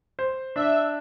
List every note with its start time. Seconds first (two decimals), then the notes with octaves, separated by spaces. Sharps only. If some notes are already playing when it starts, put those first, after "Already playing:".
0.19 C5
0.55 D4 E5